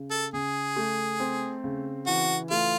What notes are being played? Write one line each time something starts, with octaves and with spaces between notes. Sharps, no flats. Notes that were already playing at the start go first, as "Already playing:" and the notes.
Already playing: C#3
A4
C#3 G#4
A3
C4
C#3
E3 F#4
A3 F4